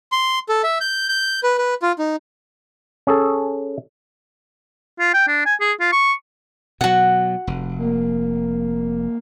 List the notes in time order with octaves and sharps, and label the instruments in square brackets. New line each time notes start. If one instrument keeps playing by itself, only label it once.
[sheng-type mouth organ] C6
A4
E5
G6
G6
B4
B4
F4
D#4
[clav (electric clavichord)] C#4 G#4 A4
[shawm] F4
G5
D4
G#5
G#4
F4
C#6
[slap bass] B2 F#3 [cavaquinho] F#4 F#5
[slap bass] F1
[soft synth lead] A#3